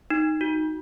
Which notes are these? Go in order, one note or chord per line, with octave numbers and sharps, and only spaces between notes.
D#4
F#4